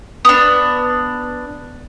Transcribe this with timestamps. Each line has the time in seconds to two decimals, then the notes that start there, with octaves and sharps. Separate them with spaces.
0.25 B3 D4